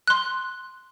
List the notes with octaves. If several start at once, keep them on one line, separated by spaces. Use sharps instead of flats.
C6 F#6